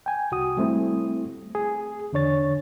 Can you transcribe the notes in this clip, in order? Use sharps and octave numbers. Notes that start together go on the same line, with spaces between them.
G5 G#5
C2 F#4 D#6
G3 A3 C4 E4
G#4
E2 D3 D4 C#5 A6